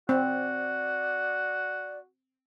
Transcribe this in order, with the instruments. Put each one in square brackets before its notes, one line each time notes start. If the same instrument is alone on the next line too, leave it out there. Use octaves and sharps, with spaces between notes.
[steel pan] C4 [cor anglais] F#4 [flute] D5